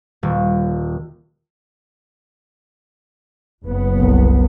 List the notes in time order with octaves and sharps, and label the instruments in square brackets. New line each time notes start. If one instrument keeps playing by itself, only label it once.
[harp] D#1
[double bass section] F#1 B3
[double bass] C2